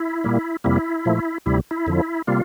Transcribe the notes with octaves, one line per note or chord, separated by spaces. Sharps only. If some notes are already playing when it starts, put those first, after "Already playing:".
Already playing: E4
A#2 G3 A#3
F2 C3 G3 A#3 E4
A#2 F3 A3
D2 C3 G3 E4
E4
F2 D3 F3
C3 G3 A#3 F4